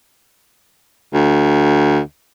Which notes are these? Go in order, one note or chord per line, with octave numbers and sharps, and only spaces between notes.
D2